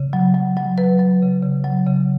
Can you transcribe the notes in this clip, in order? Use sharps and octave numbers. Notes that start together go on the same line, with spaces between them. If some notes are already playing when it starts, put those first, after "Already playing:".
Already playing: C#3
F#3
F#3
F#3
F#3 B4
F#3
C#3
C#3
F#3
C#3